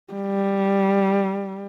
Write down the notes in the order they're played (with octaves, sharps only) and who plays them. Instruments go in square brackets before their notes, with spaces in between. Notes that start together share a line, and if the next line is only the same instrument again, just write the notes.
[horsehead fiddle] G3